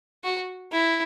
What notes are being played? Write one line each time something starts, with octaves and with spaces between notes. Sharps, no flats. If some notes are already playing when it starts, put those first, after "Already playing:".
F#4
E4